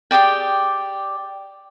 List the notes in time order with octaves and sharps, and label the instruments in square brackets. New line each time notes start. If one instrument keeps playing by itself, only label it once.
[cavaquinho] G4 G#4 D5 G5